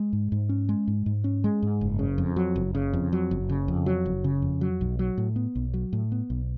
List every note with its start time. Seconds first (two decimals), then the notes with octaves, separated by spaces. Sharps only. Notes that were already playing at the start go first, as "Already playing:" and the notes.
Already playing: G#3
0.13 G#2
0.32 G#2
0.49 C#4
0.69 G#3
0.87 G#2
1.06 G#2
1.24 C#4
1.44 G#3
1.63 G#2
1.81 F#1
1.99 C#3
2.18 F2
2.36 F#3
2.56 F#1
2.75 C#3
2.93 F2
3.12 F#3
3.31 F#1
3.49 C#3
3.68 F2
3.86 F#3
4.06 F#1
4.24 C#3
4.42 F2
4.61 F#3
4.81 B1
4.99 F#3
5.18 A2
5.36 B3
5.55 B1
5.74 F#3
5.93 A2
6.12 B3
6.30 B1